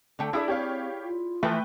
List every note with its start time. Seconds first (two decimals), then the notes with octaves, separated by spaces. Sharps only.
0.19 D3 A3 A4 G5
0.33 D4 E4 G#4 D5 E5
0.48 C4 G4 C#5 F5
1.03 F4
1.43 E3 F3 A3 B4 G5